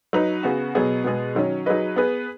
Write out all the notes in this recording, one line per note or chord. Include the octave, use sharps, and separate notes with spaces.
F#3 D#4 B4
C#3 B3 F#4
B2 F#3 B3 G#4
B2 G#3 B3 G#4
D#3 F#3 C#4
F#3 D#4 G#4 B4 D#5
B3 G#4 B4